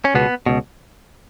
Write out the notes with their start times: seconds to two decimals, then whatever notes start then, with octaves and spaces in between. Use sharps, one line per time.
0.05 C#4
0.15 C#2 B2 B3
0.46 C#2 B2